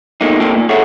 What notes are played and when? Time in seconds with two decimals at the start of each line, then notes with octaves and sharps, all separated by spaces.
0.21 B2 G#3 A#3 D#4
0.40 A#2 A#3 C4 G4 A4
0.56 A#2
0.69 G#4 A4 C#5 E5 F#5